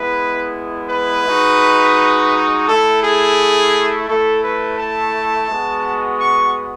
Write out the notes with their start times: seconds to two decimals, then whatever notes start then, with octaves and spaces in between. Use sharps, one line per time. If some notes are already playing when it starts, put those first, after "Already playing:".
Already playing: G#3 B3 E4 B4
0.90 B4
1.25 G#3 D#4 F#4
2.67 A3 E4 A4
3.03 G#4
4.08 A3 E4 A4
4.44 B4
4.79 A5
5.49 G#3 B3 F#4
6.19 C#6